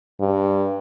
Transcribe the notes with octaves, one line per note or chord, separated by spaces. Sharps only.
G2